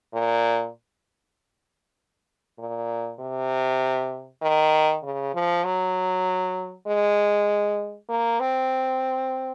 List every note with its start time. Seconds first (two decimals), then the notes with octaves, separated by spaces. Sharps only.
0.13 A#2
2.59 A#2
3.19 C3
4.42 D#3
5.03 C#3
5.34 F3
5.64 F#3
6.87 G#3
8.09 A#3
8.40 C4